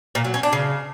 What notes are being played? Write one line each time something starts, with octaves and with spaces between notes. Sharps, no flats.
A#2
F#3
C#4
D4
C#3